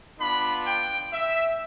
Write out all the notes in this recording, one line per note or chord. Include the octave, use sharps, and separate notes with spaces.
B3 D4 F4 B5
G5
E5